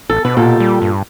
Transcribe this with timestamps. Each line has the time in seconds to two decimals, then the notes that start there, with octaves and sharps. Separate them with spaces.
0.09 A1 A4
0.25 B2 B4
0.37 A#2 G4 A4
0.60 G3
0.82 G2